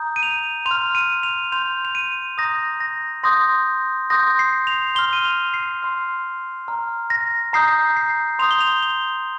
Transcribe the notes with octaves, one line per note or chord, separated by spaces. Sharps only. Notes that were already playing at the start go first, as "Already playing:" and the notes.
Already playing: A#5 D#6 G6
D#7
F7
C6 F7
F6
D#7
F7
C6 G6 F7
F7
D#7
A#5 D#6 G6 A#6
A#6
C6 D#6 G6 A#6
C6 D#6 G6 A#6
C7
F7
C6 F6 G7
D#7
F7
C7
C6 F6
A#5 F6
A#6
A#5 D#6 G6 C7
C7
C6 D#6 G6 F7
G7
F7
G7